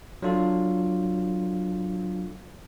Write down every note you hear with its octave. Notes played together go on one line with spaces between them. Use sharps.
F#3 D4 F4 A4